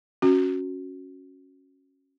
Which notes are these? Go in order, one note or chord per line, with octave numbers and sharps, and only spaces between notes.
C#4 F#4